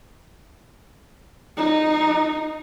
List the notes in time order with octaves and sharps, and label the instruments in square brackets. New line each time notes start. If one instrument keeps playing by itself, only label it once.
[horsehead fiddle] D#4